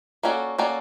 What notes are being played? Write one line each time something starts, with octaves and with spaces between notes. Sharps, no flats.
A#3 C#4 F#4 A4 D5
A#3 C#4 F#4 A4 D5